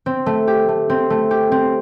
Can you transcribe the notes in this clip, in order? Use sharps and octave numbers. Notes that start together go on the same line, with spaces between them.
C4
A3
G4
A3
C4
A3
G4
C4